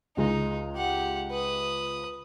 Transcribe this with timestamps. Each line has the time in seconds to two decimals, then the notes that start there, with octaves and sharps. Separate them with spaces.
0.17 C#2 G#3 D#4
0.76 G4 F#5
1.31 B4 D#6